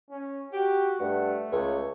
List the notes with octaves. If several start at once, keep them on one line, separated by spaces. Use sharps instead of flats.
C#4
F#4 G4
G2 A3 F#5
C#2 C#5